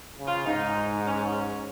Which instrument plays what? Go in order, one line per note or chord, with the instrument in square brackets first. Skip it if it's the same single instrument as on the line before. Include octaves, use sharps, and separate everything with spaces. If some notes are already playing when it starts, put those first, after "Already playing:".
[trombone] C#3
[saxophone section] F4
[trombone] G#2 [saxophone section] D#4
[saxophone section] C#4